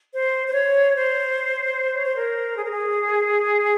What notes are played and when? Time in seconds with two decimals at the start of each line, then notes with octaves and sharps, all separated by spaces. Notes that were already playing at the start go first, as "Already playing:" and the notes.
0.13 C5
0.48 C5
0.53 C#5
0.94 C5
1.94 C#5
2.05 C5
2.16 A#4
2.55 G#4
2.63 A#4
2.72 G#4